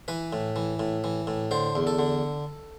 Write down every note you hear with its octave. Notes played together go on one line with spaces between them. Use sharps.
E3 B4
A2
E3
A2
E3
A2
D3 C5
E2
A4
D3